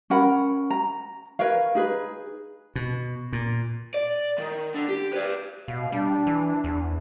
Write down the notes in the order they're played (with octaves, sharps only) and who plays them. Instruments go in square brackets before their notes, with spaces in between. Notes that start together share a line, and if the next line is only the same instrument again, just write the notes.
[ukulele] C#4 A#4 F#5 B5
A#5
A#4 B4 C#5 F5
D#4 G#4 B4
[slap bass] B2
A#2
[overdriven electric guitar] D5
D#3
D3
G4
B4 D5
[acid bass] B2 [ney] F5
[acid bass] G3 [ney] D4
[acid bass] E3
E2